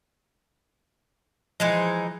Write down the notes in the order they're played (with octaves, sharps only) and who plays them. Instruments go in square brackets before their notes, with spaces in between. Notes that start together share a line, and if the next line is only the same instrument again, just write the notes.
[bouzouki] E3 G#3 D#4 [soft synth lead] F3